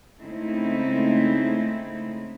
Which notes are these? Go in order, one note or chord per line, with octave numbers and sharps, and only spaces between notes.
C#3 G#3 A3 C4 D#4 E4